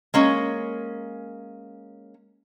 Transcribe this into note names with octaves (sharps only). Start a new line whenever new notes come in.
G#3 A#3 C#4